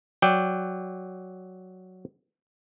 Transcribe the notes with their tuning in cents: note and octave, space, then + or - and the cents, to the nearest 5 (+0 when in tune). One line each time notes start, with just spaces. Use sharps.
F#3 +0 D5 +0 G5 +0